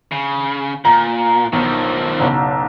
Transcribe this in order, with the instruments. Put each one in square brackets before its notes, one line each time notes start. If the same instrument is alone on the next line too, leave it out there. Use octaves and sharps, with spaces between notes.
[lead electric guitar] C#3
[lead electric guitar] A#2 [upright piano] A#5
[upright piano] B1 [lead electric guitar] D#3 F3
[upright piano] F#1 B1